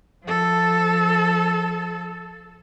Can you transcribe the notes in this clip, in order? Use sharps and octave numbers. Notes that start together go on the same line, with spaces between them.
F3 A4